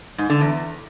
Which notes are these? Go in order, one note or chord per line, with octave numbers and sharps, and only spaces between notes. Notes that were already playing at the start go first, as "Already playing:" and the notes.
G#2
D3
E2